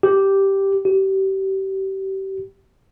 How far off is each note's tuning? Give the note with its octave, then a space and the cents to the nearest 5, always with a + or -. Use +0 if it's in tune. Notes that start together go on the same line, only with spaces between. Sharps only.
G4 -5
G4 -30